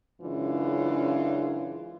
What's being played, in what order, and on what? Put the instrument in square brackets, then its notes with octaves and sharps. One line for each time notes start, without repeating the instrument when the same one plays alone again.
[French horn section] F#2 C#3 E3 G#3 D4 F4